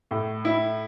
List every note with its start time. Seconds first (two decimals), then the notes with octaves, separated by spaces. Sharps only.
0.11 A2
0.45 E4